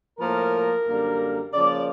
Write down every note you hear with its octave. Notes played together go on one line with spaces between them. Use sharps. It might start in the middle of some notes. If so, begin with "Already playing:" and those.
A2 F3 A#3 A#4
F#2 D3 G3 A#3
C#3 F3 A#3 D5